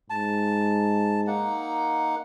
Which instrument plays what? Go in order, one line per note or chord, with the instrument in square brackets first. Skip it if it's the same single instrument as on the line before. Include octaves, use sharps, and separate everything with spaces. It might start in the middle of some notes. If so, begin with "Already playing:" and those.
[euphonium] G#2 [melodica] A5
[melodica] A#3 D#4 F#5